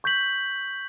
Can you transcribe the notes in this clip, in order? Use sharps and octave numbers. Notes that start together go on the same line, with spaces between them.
C#6 G6 B6 F#7